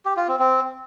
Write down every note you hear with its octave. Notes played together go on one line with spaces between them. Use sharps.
G4
F4
C4
C4